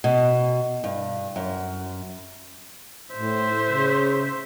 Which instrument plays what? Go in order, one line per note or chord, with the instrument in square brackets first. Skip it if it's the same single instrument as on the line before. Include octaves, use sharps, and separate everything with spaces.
[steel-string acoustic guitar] B2
G2
F#2
[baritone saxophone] A2 [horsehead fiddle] C5 E5
[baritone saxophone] C#3